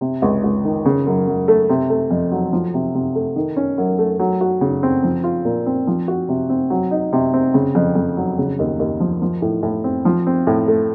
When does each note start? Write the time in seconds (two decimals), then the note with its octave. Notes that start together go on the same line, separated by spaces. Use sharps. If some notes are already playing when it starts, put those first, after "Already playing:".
0.01 C3
0.22 C#2
0.44 C#2
0.64 D#3
0.85 C#3
1.06 F#2
1.27 F#2
1.48 A3
1.69 C3
1.90 A3
2.11 F2
2.32 F#3
2.53 F3
2.74 C3
2.94 C3
3.15 A3
3.36 D#3
3.56 C#4
3.78 F#2
3.99 A3
4.19 F#3
4.41 F#4
4.61 C#3
4.83 C4
5.03 F3
5.24 F4
5.45 A#2
5.66 C4
5.87 F3
6.08 F#4
6.29 C3
6.50 C4
6.70 F#3
6.91 D#4
7.13 C3
7.34 C4
7.54 C#3
7.75 F2
7.95 F2
8.17 F#3
8.38 C#3
8.59 D#2
8.79 D#2
9.00 F3
9.22 F3
9.42 A2
9.63 A2
9.84 C4
10.05 F3
10.27 C4
10.47 A2
10.68 A3